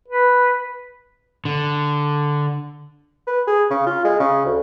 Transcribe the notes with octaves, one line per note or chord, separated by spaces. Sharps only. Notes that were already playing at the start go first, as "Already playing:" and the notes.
B4
D3
B4
G#4
C#3
F4
G#3
C#3
D2